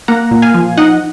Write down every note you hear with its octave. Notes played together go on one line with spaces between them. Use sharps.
A#3 F#5 A#5
A#2
F5 G#5
F3
D#4 D#5 F#5